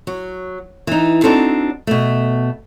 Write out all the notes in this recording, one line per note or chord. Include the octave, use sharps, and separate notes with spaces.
F#3
E3 D#4
C4 D4 D#4 F#4 A4
B2 A3